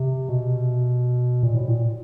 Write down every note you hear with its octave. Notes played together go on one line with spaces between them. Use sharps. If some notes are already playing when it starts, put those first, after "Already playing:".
Already playing: C3
B2
A#2
A2
A#2